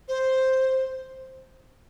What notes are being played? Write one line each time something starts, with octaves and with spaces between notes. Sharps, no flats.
C5